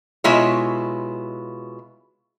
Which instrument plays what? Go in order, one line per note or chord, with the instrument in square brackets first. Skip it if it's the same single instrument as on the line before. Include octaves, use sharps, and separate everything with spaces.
[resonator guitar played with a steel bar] B2 G#3 E4 F4 C#5